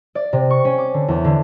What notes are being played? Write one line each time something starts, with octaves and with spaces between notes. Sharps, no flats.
D5
C3
C#6
C#4
D6
D3
E2
D3